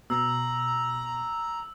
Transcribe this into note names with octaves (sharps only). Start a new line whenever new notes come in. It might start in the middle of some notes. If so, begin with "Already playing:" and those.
B2 A#5 E6